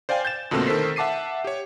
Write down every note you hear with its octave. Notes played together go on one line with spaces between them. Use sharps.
C5 D5 F5 G5 G#5
G6 A6 E7
F2 B2 D3 A3 A#3 C4
D#3 A4 A#4 C5 B6 C7
E5 F#5 A5 D6 C7 D#7
G4 C#5